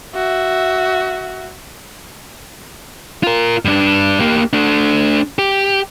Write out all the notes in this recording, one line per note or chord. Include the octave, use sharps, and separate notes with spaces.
F#4 E5
F4 A#4
G2 D4
A#3 G4
A3 D4
G4